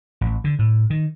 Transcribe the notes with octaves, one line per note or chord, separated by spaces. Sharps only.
A1
D3
A2
D#3